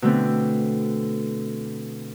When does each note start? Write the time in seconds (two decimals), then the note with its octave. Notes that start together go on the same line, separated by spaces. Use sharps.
0.02 B2 D3 A3 C4